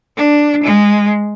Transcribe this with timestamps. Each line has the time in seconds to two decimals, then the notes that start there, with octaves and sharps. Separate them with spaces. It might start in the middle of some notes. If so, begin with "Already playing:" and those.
0.16 D4
0.63 G#3